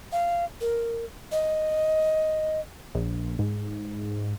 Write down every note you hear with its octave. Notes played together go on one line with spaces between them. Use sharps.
F5
A#4
D#5
A#1
G#2